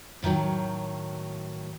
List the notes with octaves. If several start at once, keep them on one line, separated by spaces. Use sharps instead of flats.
A2 D#3 E3 F#3